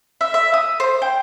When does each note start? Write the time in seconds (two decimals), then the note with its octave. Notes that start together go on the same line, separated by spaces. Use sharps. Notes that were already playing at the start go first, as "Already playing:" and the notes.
0.21 E5
0.34 E5
0.54 D#6
0.80 C5
1.02 G5